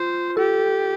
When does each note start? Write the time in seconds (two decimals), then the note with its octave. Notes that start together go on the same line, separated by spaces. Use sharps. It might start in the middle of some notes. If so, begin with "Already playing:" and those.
Already playing: F4 C5
0.37 G4 A4